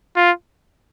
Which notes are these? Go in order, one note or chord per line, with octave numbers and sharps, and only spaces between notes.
F4